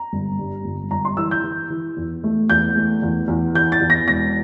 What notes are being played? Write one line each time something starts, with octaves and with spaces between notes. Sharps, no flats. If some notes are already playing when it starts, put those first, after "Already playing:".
Already playing: A#5
G1
G2
G1
G1 A#5
C6
E3 E6
G6
E3
E3
E2
A3
E2 G6
A3
E2
E2
E3 G6
A6
E2
A#6
E1 A#6